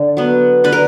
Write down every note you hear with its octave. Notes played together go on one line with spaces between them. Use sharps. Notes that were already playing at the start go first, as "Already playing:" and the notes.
Already playing: D3
F#3 B3
D3 B4
A#4